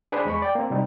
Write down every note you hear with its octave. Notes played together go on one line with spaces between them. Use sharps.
D4 G#4 B4 C5
E2 G#3 B5 C#6
D5 G5
A#3 C4
C3 G3 D#4